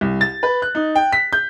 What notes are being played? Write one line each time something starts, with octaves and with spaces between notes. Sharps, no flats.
C2
A6
B4
F#6
D#4
G5
B6
G6